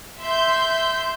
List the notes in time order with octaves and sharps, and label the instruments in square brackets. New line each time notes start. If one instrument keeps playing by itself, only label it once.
[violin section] E5 C6 G6